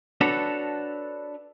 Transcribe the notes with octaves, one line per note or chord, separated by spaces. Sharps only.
D4 F#4 A4 B4 C#5